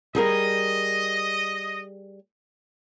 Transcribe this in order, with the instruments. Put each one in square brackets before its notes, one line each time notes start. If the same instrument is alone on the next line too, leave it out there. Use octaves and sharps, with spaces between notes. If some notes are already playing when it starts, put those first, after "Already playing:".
[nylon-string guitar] G3 G#4 A#4 [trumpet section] D#5